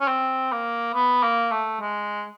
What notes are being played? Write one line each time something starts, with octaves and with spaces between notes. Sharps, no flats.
C#4
C4
A#3
B3
A#3
A3
G#3